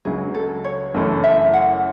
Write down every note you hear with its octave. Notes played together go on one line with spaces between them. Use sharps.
C#2 C#3 F#3 G#4
A4
C#5
F#1 F#2 E3 A3 E4
E5
F#5